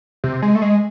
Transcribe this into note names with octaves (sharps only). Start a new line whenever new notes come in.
C3
G#3
A3
G#3